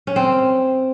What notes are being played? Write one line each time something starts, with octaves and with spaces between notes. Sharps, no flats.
C#4
C4